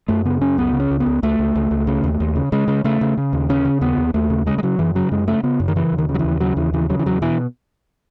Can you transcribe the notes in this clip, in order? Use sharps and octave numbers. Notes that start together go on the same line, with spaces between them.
F#2 A3
C#3 B3
F#2 C#4
C#2 B3
C#3
C#4
C#2
B3
C#2
C#2 A3
C#2
C#2
C#2
C#3
D#2
D#2
C#3
C#3 G#3
C#3
C#3 A3
C#3
C#3
D#2
C#3 C#4
C#3
D#2 B3
D#2
D#2 A3
C#3
C#3 G#3
G#3
C#3 F#3
F#2 E3
C#3 F#3
F#2 G#3
C#3 A3
C#3 B3
F#2
D#3
C#3 E3
D#2
D#3
C#3
F#3
E3
D#2
C#3 F#3
D#2 E3
C#3 E3
C#3 F#3
E3
E2 F#3
B2 E3